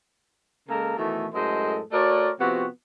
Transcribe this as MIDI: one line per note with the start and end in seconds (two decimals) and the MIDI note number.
0.69 0.97 49
0.69 0.97 56
0.69 0.97 58
0.69 0.97 69
0.69 0.97 70
0.97 1.27 47
0.97 1.27 51
0.97 1.27 52
0.97 1.27 57
1.34 1.80 42
1.34 1.80 45
1.34 1.80 56
1.34 1.80 69
1.34 1.80 72
1.34 1.80 75
1.92 2.30 57
1.92 2.30 66
1.92 2.30 70
1.92 2.30 73
1.92 2.30 74
2.40 2.66 48
2.40 2.66 53
2.40 2.66 59
2.40 2.66 60
2.40 2.66 66